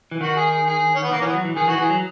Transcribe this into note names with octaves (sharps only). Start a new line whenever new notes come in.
E3
D#3 F#4
G#4
G#4
G#4
C#4
B3
D#3 A#3
E3 B3 C#4
F#3
E3
D#3 G#4
E3 F#4
E3 G#4
F#3